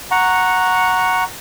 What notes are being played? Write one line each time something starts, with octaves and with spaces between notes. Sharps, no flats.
F#5 A#5 C#6